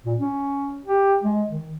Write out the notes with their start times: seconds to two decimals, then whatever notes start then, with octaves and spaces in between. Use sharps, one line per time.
0.06 A#2
0.19 C#4
0.86 G4
1.23 G#3
1.48 D#3